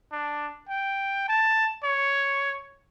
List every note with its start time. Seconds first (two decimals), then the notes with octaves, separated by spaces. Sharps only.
0.12 D4
0.69 G5
1.28 A5
1.84 C#5